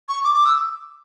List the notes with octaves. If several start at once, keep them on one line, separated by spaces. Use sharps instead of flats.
C#6
D6
D6
E6